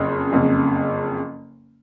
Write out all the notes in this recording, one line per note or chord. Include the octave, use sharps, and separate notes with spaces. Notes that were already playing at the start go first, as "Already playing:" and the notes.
Already playing: F#1 F2 C#3
F#1 F2 C#3